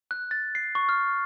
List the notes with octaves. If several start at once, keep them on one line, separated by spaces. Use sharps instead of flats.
F#6
A6
C7
C#6
F6